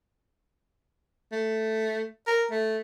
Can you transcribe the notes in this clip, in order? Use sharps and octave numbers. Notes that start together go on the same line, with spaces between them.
A3
A#4
A3